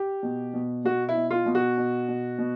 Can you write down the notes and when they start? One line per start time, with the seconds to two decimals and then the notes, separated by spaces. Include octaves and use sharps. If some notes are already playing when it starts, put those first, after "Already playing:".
Already playing: G4
0.23 B2
0.54 B2
0.85 B2 F#4
1.09 E4
1.16 B2
1.31 F4
1.46 B2
1.55 F#4
1.78 B2
2.09 B2
2.39 B2